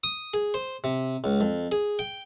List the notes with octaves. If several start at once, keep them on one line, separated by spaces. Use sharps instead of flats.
D#6
G#4
C5
C3
C#2
F2
G#4
G5